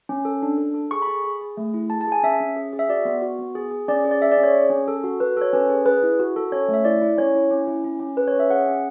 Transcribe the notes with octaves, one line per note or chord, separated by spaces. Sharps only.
C#4
A4
D4
A4
A4
G#4 C#6
B5
G#4
G#4
G#4
A3
E4
G#4 A5
A5
G#4 G#5
C#4 E5
C#4
G#4
G#4
E5
F#4 D5
B3
F#4
B3
G#4
G#4
C#4 D5
G#4
D5
G#4 E5
D5
C#4
C#5
G#4
C#4
A4
F#4
F#4 B4
A4 C#5
C#4 B4
G#4
G#4 B4
E4
F#4
A4
C#4 C#5
A3
E5
E4 D5
E4
C#4 C#5
E4
C#4
E4
C#4
C#4
G#4 B4
C#5
C#4
E5
G#4 F#5
C#4